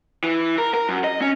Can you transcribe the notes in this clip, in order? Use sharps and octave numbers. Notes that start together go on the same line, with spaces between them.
E3
A#4
A#4
F#2
D#5
C#4